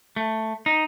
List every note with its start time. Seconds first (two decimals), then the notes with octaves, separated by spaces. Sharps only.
0.16 A3
0.66 D#4